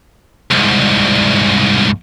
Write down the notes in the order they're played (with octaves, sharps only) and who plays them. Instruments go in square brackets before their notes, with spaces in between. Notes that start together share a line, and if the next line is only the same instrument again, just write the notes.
[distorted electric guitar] C2 G#2